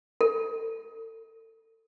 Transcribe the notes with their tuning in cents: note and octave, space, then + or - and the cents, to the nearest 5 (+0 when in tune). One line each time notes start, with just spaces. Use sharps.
A4 +35